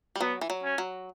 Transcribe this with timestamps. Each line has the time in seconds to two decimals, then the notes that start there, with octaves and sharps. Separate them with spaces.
0.16 G3
0.21 F#3 B3
0.41 E3
0.50 F#3
0.64 C#4
0.78 F#3